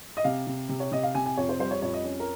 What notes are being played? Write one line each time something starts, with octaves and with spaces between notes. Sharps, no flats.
D#5
C3 F5
C3
C3
C#5
C3 D#5
F5
C3 G#5
G#5
F2 C#5
C5
G3 C5
C#5
F2 C#5
D#5
C#4
A#4